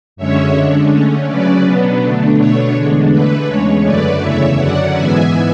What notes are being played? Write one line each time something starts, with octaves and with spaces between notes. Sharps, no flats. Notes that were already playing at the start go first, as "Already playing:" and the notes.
F#2 D3 G#3 C#4 C#5 E5
D3 G#3 D4
D3 A3 C#4
C#3 F#3 C#4 B4 D5
B2 F#3 B3 D4
D3 A3 D4
B2 A3 D4 C#5
E2 D3 G#3 D4
D3 A3 D4 B4
E2 C#3 G#3 C#5
F#2 D3 A3 B4 D5
E2 C#3 E3 C#5 E5
F#2 D3 F#3 C#4 D5 F#5
G#2 E3 G#3 B3 E5 G#5